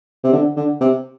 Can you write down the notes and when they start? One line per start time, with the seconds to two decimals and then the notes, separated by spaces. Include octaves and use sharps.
0.24 C3
0.33 D3
0.56 D3
0.81 C3